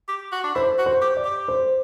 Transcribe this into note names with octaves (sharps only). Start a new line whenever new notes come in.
G4
F#4
D4
E4 C5
F#4
C5
G4
D5
G4
C5